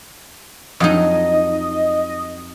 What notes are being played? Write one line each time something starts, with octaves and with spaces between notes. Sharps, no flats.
F2 F#3 D#4 D#5